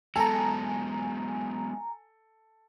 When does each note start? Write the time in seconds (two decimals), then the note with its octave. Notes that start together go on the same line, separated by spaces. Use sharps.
0.16 F#3 G#3 B3 A4 G#5 A#5